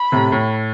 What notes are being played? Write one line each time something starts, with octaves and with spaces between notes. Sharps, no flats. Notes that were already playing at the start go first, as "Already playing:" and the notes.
Already playing: B5
A2 C3
A2